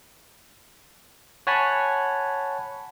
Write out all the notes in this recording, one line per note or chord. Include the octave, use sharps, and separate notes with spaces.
C#5 F#5 G#5 A5 B5